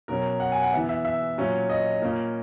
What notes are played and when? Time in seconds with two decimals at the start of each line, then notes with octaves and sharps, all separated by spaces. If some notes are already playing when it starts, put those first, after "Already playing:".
0.08 B2 F#3 C#4 A#4
0.40 F#5
0.52 G#5
0.62 F#5
0.73 E3 B3 E5
0.89 E5
1.05 E5
1.38 A#2 F#3 C#4
1.70 D#5
2.02 A#2 A#3 C#4